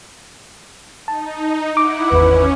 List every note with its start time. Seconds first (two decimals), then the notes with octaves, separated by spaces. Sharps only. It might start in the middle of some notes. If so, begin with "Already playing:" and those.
1.08 D#4 A5
1.77 E4 F#5 D6
2.11 G#1 E2 C#4 B4